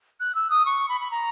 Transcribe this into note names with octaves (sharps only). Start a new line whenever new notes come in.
F#6
E6
D#6
C#6
B5
B5
A#5